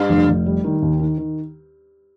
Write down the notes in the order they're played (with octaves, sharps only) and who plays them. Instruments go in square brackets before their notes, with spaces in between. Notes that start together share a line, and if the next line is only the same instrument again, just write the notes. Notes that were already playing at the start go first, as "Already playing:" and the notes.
Already playing: [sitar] G2
[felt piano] F1
F1
G3
D#3
D#2
D#3
D#3